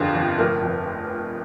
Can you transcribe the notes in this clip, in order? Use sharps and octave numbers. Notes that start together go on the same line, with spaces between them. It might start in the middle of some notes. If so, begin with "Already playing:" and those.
Already playing: G1 F2 D3 G4 G#4 A#4 C5 F5
G1
F1 A#4
F2